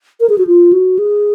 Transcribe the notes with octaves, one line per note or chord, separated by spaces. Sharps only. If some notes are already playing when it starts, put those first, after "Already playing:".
A#4
G#4
F#4
F4
F#4
G#4